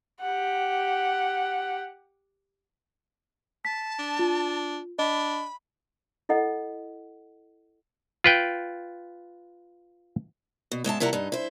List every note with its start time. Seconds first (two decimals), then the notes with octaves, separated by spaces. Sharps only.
0.21 G4 F#5
3.65 A5 B6
3.99 D4
4.19 F4
4.99 D4 D#5 B5
6.29 E4 A4 D#5 F#5
8.24 F4 B4 G5
10.72 B2
10.84 G#2 G#3 E5 A5
11.00 C3 G3 E4 A#4 F#5
11.13 G2 D#4
11.32 E4 C5